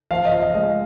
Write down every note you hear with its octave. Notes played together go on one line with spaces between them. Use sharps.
F3 F5
D#5
F3
D#5
G#3 D#5